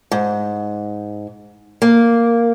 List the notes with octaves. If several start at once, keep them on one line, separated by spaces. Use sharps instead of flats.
G#2
A#3